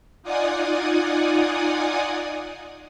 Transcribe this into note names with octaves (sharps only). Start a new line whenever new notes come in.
D#4 F4 D5 F#5 G#5 D#6